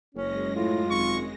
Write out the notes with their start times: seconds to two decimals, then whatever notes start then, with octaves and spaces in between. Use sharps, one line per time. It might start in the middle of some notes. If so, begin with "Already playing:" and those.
0.15 F#1 F#2 G#3 C#4 A#6
0.56 A2 F4
0.91 G#1 C#6